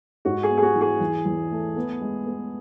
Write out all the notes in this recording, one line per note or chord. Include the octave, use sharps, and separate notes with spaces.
G#2 F#4
G#4
B3
G#4
F#4
E3
G#4
E2
E2
A3
B3
G#3
B3